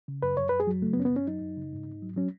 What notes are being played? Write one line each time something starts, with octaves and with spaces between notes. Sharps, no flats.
C#3
F#2 B4
F#2 C#5
F#2 B4
G#4
F#3
C#3 A3
B3
F#2 C#4
B3
F#2 C#4
F#3 D#4
F#2
C#3
G#2
G#2
F#3
F#3 C#4